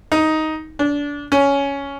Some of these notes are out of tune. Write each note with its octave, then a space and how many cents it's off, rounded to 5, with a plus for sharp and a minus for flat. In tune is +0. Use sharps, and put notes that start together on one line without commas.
D#4 +10
D4 -25
C#4 +10